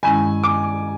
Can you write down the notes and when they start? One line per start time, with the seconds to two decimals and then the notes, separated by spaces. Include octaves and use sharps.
0.03 G2 D#3 G#3 C#4 E4 G#5
0.44 D6